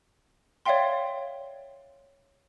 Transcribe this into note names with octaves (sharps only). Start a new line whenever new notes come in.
C#5 D5 E5 F5 G5 C6